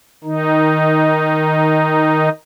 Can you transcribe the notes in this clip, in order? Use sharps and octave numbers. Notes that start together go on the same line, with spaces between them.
D#3 D#4